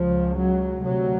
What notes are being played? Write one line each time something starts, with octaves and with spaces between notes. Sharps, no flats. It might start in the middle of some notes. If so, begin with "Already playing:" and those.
Already playing: C#2 C#3 F3
F#3
D2 C3 F#3